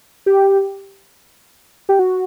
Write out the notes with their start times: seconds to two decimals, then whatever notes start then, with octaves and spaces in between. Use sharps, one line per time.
0.26 G4
1.89 G4
1.99 F#4